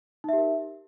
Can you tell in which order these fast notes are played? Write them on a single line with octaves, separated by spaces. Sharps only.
D#4 E5 G4 A#4